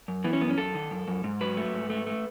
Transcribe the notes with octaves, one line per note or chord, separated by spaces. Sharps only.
F#2
E3 B3
C#4
F#2 B3
C#4
F#2 A4
D#3
F#2
F#2
G#2
F#3 B4
A3
G#2
A3
A3